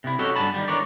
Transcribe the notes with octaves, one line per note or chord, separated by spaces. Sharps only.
C3 E4
C#4 F#4 G4 A4 C#5 D#5
G2 D3 G#5 A5 B5
D#3 F3 G3
E3 G#3 D4 A#4 C#5 D5